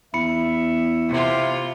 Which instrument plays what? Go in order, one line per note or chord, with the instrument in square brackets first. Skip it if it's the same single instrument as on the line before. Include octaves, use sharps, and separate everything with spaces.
[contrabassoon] E2 [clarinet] E5 [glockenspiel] B5 C#7
[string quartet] C3 E4 F4